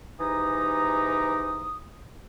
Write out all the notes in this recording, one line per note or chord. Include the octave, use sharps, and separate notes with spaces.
G#2 E3 D#4 G4 A#5 D#6